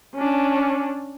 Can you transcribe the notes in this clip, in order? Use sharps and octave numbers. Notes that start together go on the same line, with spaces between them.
C#4 D4